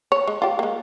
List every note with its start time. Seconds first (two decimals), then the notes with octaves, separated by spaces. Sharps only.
0.12 C#5
0.28 G#3
0.42 F4 G4
0.59 G#3 A#3